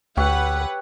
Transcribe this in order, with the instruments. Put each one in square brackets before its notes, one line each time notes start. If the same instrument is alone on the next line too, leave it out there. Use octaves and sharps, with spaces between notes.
[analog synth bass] D2 [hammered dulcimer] G4 C#5 E5 [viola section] B4 F#5